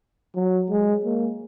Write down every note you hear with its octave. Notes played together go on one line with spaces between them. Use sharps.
F#3
G#3
A#3